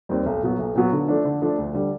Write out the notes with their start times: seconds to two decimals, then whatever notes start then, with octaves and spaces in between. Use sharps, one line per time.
0.09 D#2 D#3 G3 C4
0.26 B1
0.43 A#2 F#3 B3
0.59 B1
0.75 A#2 F#3 B3
0.92 D3
1.08 F3 A3 D4
1.25 D3
1.42 F3 A3 D4
1.58 D2
1.74 D3 G3